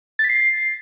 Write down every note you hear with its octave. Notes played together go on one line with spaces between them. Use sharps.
A6
B6
C7